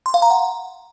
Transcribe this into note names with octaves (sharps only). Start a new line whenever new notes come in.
C6
F5
A#5
F#5